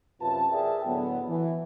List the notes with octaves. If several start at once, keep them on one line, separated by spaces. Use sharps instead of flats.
F#2 C3 F4 B4 A5
G#4 A#4 D5 E5 G5 A5
A2 D3 F#3 B3
E3